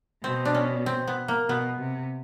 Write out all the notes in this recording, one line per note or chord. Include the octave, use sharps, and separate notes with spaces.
B2 C4
D4
C#4
C4
B3
A#3
B2 B3
C3